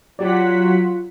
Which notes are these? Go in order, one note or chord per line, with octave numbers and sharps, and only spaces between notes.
F#3 F4 G4 D5 F#5 B6